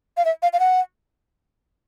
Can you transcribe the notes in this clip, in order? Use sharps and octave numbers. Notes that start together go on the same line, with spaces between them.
F5
E5
F5
F5
F#5